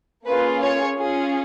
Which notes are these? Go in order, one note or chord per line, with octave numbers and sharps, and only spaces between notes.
A#3 C#4 F4 G#4 B4
C#5
C#4 F4 G#4